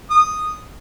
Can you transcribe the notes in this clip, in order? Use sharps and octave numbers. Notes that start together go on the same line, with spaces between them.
D#6